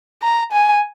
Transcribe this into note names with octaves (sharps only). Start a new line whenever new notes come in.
A#5
G#5